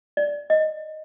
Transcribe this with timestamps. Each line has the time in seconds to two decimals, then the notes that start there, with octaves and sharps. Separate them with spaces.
0.17 D5
0.50 D#5